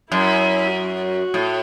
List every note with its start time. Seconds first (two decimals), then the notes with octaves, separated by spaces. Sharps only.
0.11 F#2 E4
0.73 F#4
1.34 A2